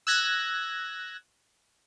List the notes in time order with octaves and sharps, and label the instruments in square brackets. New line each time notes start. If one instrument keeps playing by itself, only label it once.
[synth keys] E6 F#6 G#6 A#6